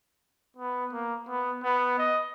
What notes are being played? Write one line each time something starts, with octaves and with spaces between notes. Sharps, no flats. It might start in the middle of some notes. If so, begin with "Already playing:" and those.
B3
A#3
B3
B3
D#5